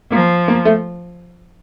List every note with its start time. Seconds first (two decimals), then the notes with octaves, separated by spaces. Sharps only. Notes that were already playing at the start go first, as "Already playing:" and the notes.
0.12 F3 A#3
0.48 A#3
0.65 A3